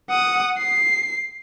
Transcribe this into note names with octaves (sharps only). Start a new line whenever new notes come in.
F#5 D#6
C7